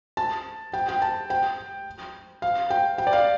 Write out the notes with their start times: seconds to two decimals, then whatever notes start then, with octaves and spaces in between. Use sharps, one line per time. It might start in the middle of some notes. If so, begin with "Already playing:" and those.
0.17 A5
0.73 G5
0.89 G5
1.02 A5
1.30 G5
2.42 F5
2.70 G5
2.98 G5
3.07 D5
3.13 F5